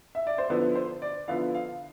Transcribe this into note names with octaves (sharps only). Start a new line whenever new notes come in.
E5
D5
C5
D3 F3 B3 E4 B4
C5
D5
D3 F3 B3 E4 F5
F5